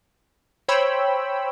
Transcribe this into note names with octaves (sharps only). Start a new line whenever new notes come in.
C5 C#5 G5 B5 E6